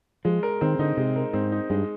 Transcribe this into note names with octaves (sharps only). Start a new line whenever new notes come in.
F3 G#3
A#4
D#3 C4
D3 D#4
C3 G#3
A#4
G#2 C4
D#4
G2 G#3